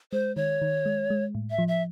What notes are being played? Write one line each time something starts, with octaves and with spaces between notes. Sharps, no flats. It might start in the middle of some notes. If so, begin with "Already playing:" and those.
G#3 C5
D#3 C#5
D#3
G#3
G#3
A2
E5
F3
E5